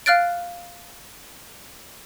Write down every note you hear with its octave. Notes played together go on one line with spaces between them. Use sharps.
F5 F6 F#6 A6 D7